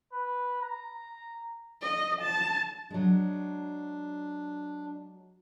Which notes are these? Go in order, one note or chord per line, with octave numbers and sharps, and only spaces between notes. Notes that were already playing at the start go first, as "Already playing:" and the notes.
B4
A#5
D#5
A5
F#3 G#3 D4